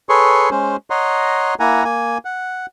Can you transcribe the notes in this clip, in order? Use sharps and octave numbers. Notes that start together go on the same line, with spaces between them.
G#4 A4 B4 C#5 C6 C#6
G#3 C#4 C5
C#5 D#5 F#5 A#5 C6
A#3 E4 F#5 G#5 A#5
A#3 G#5
F#5